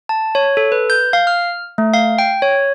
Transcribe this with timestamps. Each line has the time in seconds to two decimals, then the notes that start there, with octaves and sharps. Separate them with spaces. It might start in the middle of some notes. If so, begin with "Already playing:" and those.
0.09 A5
0.35 C#5
0.57 A4
0.72 B4
0.90 G6
1.13 F5
1.27 F6
1.78 A3
1.94 F5
2.19 G5
2.42 C#5